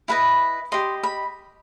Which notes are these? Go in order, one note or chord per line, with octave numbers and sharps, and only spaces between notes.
E4 B4 D#5 B5
G4 D#5 C6
B5